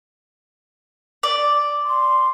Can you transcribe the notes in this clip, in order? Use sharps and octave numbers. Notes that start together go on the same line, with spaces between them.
D5
C6